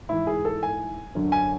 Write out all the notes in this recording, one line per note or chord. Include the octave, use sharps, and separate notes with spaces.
G#2 E3 E4
G#4
A4
G#5
F#2 D3 F#3
G#5